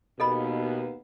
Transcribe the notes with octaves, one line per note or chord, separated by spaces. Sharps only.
D#2 B2 B3 A4 D#5 B5